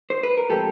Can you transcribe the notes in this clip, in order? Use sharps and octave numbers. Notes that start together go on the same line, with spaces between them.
C5
B4
A#4
A2 F3 G#3 C4 G4 A4